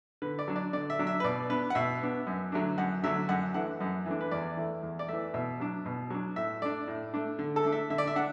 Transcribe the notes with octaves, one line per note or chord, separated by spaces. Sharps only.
D3 B4
D5
F#3 D4
D5
D3 D5
E5
F#3 D4
E5
B4
B2 D5
B3 D4 B4
F#5
B2 E5
B3 D4
F#2
D3 F#3 A3 D4
F#2 F#5
D3 F#3 A3 D4 E5
F#2 F#5
E3 A3 D4 F#5
F#2
E3 A3 D4
B4
E2 D5
E3 A3
E2
D5
E3 A3 E5
B2 E5
F#3 D4
B2
F#3 D4
A2 E5
A3 D4 D5
A2
A3 D4
D3
A4
A3 D4
E5
D3 E5
D5
E5
D4 F#5